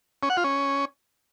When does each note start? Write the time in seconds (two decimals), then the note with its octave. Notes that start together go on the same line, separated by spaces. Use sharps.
0.23 C#4
0.30 F#5
0.37 F4
0.44 C#4